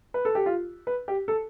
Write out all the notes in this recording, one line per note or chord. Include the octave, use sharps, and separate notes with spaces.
B4
A4
G4
F4
B4
G4
A4